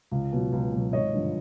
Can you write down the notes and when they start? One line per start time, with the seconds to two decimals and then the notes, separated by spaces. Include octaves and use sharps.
0.11 C#2
0.33 B2 F#3
0.52 C#2
0.73 B2 F#3
0.93 G#1 C#5 D#5
1.13 G2 D3 F3